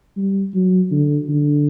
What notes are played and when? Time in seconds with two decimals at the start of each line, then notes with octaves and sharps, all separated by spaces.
0.17 G3
0.54 F#3
0.91 D3
1.29 D3